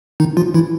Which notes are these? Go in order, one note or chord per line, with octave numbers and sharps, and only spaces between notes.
D#3 D#4
F3 F4
E3 E4